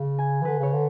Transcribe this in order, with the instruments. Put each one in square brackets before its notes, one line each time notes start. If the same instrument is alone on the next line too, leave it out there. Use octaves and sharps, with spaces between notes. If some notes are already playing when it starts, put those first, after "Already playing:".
Already playing: [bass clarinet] C#3
[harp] G#5
[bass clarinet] E3
[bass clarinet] D3 [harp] B4
[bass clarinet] C#3 [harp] C#5
[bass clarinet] D3